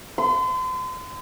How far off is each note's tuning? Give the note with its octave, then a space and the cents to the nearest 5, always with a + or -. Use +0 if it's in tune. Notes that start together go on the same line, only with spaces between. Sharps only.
C6 -40